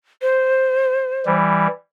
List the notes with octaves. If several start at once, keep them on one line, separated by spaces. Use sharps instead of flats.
C5
E3 G3